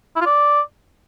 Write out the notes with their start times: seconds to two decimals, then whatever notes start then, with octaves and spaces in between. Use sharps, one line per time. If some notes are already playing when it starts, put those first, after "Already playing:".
0.16 E4
0.21 F4
0.26 D5